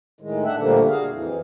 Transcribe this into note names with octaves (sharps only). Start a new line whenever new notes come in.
A2 D#3 G#3
D4 E5 F#5
A#2 D3 F3 G3 A3 A#3
F#4 G#4 F5
F2 E3